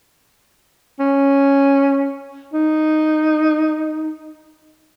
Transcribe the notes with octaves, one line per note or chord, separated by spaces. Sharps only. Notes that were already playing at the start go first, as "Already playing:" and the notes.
C#4
D#4